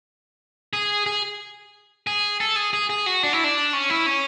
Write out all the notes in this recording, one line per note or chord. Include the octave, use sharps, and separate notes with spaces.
G#4
G#4
G#4
A4
G#4
G#4
G#4
F#4
D4
E4
D4
C#4
E4
C#4